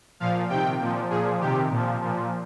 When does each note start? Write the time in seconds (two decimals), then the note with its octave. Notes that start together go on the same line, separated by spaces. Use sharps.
0.20 A#2 F3 F5
0.49 C3 D#3 G5
0.80 A#2 F3
1.10 A#2 F3 G#4
1.40 C3 D#3 G4
1.71 A#2 F3
2.01 A#2 F3